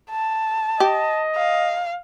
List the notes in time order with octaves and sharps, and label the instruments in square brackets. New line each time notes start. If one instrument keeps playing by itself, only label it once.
[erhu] A5
[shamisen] G4 [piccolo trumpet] D#5
[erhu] F5